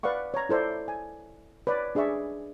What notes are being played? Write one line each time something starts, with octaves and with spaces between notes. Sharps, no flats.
B4 D5 F5 F#5 C#6
C#5 A#5
E4 A4 C5 D5
G#5
B4 C#5 D5
D4 G#4 D5 E5 C#6